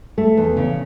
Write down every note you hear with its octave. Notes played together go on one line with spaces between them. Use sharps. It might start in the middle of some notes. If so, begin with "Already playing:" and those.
A3
E2
C#3